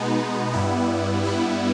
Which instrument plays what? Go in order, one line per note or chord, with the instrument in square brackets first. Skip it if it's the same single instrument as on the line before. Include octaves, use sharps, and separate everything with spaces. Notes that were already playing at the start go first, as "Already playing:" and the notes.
Already playing: [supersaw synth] B2 G#3 B3 D#4
G2 G3 B3 E4
G2 G3 B3 E4